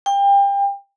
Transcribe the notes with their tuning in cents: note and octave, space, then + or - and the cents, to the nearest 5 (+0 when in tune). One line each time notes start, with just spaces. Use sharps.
G5 +30